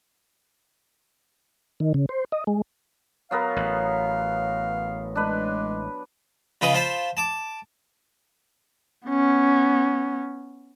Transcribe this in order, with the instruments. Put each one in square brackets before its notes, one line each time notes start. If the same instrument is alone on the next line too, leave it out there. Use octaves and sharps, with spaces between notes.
[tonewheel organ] D#3
C#3
C5
D#5
G#3
[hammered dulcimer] F#3 B3 A#4 [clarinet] F5
[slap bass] A1
[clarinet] G#3 [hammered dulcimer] D4 B4
[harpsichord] C#3 F4 B4 D#5
F4 C5 A5 B5
A5 D6
[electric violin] B3 C#4